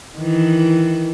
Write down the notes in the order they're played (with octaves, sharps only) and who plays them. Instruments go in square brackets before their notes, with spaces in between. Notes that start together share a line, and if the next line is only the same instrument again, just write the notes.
[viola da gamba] D#3 E3